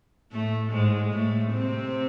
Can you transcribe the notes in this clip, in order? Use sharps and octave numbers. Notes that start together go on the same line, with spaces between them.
A2 A3
G#2 G#3
A2 A3
C3 C4